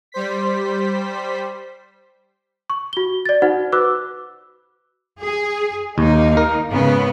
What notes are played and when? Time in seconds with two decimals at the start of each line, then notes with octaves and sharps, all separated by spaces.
0.12 G3 C5 B6
2.70 C#6
2.93 F#4 G7
3.25 D5 A6
3.42 D#4 F#4 C5 F#5
3.72 F#4 B4 D6 E6 F#6
5.21 G#4
5.98 D#2 A#3 D#4
6.37 A#4
6.71 G#2 C#3 B3